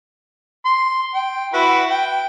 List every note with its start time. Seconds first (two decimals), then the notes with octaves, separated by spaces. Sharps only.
0.65 C6
1.14 G5
1.53 E4 F#4 B4
1.90 G5